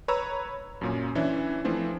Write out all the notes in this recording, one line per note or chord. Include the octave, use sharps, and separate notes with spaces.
B4 C#5 A#5 E6
F#2 A#2 C#4
E3 C#4 D4 E4
E3 F3 A3 C4 D4 F4